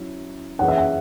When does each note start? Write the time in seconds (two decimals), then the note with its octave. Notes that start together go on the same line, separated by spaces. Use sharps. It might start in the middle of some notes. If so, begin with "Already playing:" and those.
Already playing: F#3 C#4 E4
0.59 F#2 E3 C#4 G#4 B4 F#5
0.68 E5
0.78 F#5